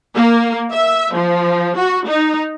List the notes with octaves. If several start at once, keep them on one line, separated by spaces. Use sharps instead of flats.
A#3
E5
F3
F#4
D#4